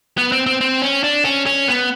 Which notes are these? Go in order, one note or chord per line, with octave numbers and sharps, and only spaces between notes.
B3
C4
C4
C4
C#4
D4
C#4
C#4
B3